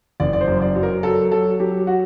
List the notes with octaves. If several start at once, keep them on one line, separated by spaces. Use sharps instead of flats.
F#1 D5
D5
C5
F#2
D5
F#3
A#4
F#3 A4
F#3 A4
F#3 G4
F#4